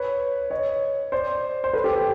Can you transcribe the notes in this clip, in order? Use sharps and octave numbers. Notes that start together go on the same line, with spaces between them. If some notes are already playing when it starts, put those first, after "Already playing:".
Already playing: B4 C#5
C#5 D#5
C5 D5
C5
A4 B4
G4 A4
G4